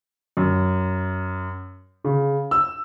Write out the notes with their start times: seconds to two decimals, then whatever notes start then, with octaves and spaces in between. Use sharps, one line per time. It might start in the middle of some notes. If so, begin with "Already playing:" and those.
0.37 F#2
2.04 C#3
2.51 E6